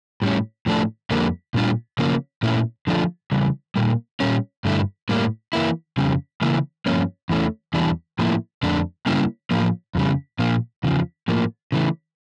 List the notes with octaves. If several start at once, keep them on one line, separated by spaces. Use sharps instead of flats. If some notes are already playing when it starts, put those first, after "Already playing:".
A2 G3 C#4
A2 F3 A3 D4
F2 D3 G3 A#3
A#2 G3 D4 F4
C#3 F3 A#3
A#2 A3 C#4 E4
D3 F3 A3 D4 F4
C#3 E3 G3
A#2 G3 A#3
A#2 G3 C#4
G2 D3 A3 E4
A2 G3 A#3
E3 A#3 E4
F2 C#3 G3
C#3 E3 A#3 E4
G2 F3 A#3 C#4
E2 E3 A3 C#4
E2 E3 G3 D4
A2 F3 A#3 E4
F2 D3 A3 D4
C#3 G3 A#3 C#4 E4
A2 F3 A#3
F2 C#3 G3
A#2 F3 A#3
E2 C#3 F3
A2 F3 A#3
C#3 E3 A3